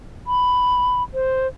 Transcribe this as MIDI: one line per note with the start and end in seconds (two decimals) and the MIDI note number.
0.27 1.03 83
1.14 1.47 72